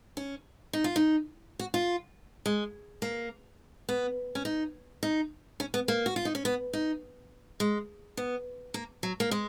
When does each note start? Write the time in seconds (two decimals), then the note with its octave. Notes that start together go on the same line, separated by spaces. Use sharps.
0.17 C#4
0.73 D#4
0.84 F4
0.96 D#4
1.59 F#4
1.74 F4
2.46 G#3
3.02 A#3
3.89 B3
4.35 C#4
4.45 D#4
5.03 D#4
5.60 C#4
5.74 B3
5.88 A#3
6.06 F#4
6.16 F4
6.25 D#4
6.35 C#4
6.45 B3
6.73 D#4
7.60 G#3
8.17 B3
8.74 A#3
9.03 F#3
9.20 A#3
9.31 G#3